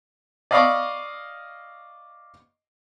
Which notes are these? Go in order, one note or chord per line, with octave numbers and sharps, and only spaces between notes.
D5 D#5 F5 B5 C#6 D6